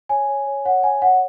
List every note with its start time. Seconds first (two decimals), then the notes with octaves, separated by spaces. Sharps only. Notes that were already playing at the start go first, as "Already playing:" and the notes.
0.09 C#5 G#5
0.28 C#5
0.47 C#5
0.65 C#5 F#5
0.83 C#5 G#5
1.02 C#5 F#5